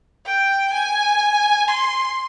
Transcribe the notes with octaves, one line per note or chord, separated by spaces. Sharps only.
G5
G#5
C6